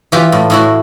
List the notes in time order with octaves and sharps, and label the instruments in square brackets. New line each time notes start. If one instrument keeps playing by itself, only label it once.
[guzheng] E3 F4 G4
A2
A2 E4 F#4